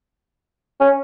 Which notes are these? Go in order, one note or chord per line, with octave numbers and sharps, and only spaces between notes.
C#4